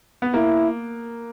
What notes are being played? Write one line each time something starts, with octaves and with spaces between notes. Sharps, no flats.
B3
A#3 E4